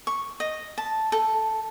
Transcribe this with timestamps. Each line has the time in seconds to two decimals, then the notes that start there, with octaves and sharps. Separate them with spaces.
0.07 C#6
0.40 D#5
0.78 A5
1.12 A4